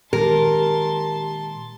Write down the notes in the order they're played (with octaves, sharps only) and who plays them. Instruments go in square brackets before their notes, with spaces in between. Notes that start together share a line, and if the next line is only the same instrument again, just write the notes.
[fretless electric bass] A#2 D#3 G#3 [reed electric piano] G4 [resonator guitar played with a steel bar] A#4 [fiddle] A5 C6